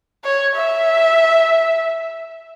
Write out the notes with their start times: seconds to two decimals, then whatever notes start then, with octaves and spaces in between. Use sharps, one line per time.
0.24 C#5
0.55 E5